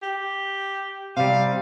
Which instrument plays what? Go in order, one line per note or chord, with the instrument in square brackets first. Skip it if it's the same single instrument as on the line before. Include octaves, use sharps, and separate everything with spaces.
[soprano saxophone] G4
[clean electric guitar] C3 G3 [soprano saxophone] F5